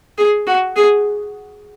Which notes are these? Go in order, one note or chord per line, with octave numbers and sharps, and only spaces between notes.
G#4
F#4
G#4